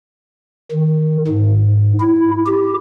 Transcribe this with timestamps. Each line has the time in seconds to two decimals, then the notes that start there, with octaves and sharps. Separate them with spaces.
0.72 D#3
1.28 G#2
2.00 E4
2.46 G4